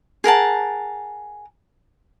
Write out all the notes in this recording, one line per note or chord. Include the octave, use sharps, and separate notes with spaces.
G#4 A#4 F#5 A5